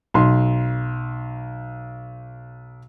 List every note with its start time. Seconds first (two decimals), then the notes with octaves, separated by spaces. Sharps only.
0.14 B1 C6